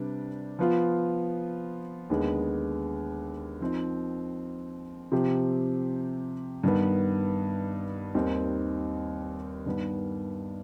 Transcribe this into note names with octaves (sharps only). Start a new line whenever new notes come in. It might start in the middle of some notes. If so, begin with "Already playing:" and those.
Already playing: C3 G3 D4 B4
F3 B3 F4
D#2 D3 G#3 B3
F3 C4 D#4
C3 F3 C4 G4
G2 D#3 B3
D#2 D#3 G3 C4 D#4
G2 D#3 B3